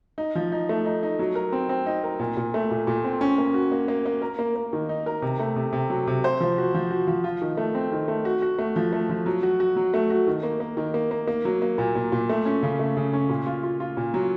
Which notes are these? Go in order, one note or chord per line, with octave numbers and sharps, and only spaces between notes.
D#4
F3
D#4
A3
D#4
D#4
F#3
A#4
C4
C4
D#4
A#4
A#2
A#2
A3
A#2
A#2
C4
C#4
A#3
F#4
A#3
A#3
A#3
A#4
A#3
A#3
D#3
D#4
A#4
C3
A3
C3
C3
F#3
C3
C5
F3
F#4
F3
F#4
F3
F4
D#3
A3
C4
D#3
A3
F#4
F#4
A3
F3
A3
F3
F#3
F#4
F#4
F#3
A3
F#4
D#3
A#3
A#3
D#3
A#3
A#3
A#3
F#3
A#3
A#2
A#2
A#2
A3
C#4
C#3
A3
C#3
C#4
A#2
F4
F4
F4
A#2
F#3